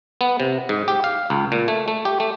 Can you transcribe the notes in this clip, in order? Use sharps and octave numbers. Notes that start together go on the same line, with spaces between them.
B3
C3
G#2
G4
F5
C#2
A#2
A3
A3
G4
A3